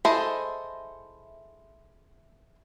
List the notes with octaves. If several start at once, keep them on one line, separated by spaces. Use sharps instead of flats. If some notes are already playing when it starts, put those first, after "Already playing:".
E4 G#4 A4 C5 D#5